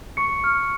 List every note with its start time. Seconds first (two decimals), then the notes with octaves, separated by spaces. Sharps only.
0.17 C#6 C#7
0.44 F6